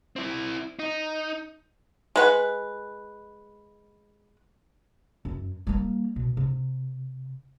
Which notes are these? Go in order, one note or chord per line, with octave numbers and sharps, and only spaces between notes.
C4 E4
D#4
G#3 B4 F#5
F#2
G3 A#3
B2
C3